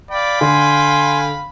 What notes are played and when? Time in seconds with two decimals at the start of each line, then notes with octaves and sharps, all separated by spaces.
0.11 D5 F5 G5 B5
0.41 D3 G#5 C6